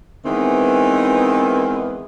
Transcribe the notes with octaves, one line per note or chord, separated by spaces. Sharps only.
D#3 E3 G#3 B3 C4